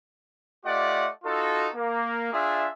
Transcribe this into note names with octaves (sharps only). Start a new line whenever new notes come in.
A3 F4 G4 D5 D#5 F#5
D#4 F4 F#4 A4
A#3
D4 F4 G#4 E5